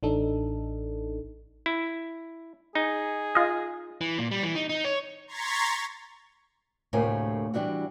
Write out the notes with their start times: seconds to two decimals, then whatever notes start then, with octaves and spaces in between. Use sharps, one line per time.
0.03 A1 D4 D#4 A4
1.66 E4
2.75 D#4 G#4
3.35 F4 D#5
4.01 E3
4.18 A#2
4.31 G3
4.43 E3
4.55 D#4
4.69 D#4
4.85 C#5
5.27 A#5 C6 C#6 G#6 A6 B6
6.93 D2 A2 C3 A#3 A#4 G#5
7.54 E3 G3 D4 E4 F#4